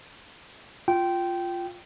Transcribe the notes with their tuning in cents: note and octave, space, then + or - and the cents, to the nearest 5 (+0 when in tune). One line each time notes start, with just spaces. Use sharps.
F4 +0 G5 -15